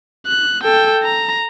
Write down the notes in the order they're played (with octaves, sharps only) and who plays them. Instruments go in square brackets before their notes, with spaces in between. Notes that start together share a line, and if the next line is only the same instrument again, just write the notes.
[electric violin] F#6
A4 G5
A#5